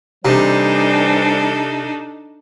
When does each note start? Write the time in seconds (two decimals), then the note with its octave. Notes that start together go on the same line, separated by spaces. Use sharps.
0.25 C3 E3 G3 D4 D#4 A4 C5